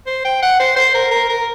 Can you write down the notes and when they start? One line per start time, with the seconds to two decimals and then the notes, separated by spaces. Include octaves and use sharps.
0.07 C5
0.25 G5
0.42 F#5
0.59 C5
0.76 C5
0.94 A#4
1.11 A#4
1.29 A#4